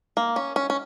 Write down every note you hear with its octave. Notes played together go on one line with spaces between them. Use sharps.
A#3
C#4
C#4
C#4